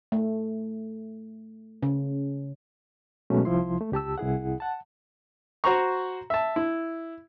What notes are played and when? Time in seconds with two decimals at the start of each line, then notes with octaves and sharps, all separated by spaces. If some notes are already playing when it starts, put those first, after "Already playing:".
0.12 A3
1.83 C#3
3.30 B2 F#3 G#3 A3 C#4
3.45 C2 F3 E4 C6
3.81 A3
3.92 C#2 G4 A5 E6
4.18 C2 E4 G#4 F#5
4.60 F#5 A5
5.64 F#4 C5 A#5 C#6
6.30 E5 A5
6.56 E4